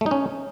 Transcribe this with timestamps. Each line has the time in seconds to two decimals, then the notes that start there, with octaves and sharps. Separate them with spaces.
0.01 A3
0.06 D#4
0.11 C#4